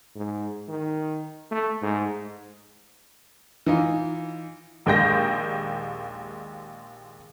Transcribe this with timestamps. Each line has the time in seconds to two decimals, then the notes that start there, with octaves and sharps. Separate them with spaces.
0.15 G#2
0.69 D#3
1.51 A3
1.82 G#2
3.66 E3 D#4 F4
4.86 A#1 D#2 G#3 G5 G6 A#6